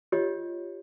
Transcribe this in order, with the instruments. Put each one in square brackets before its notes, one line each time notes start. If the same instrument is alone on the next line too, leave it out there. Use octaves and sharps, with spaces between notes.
[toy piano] F4 G4 C#5 D#5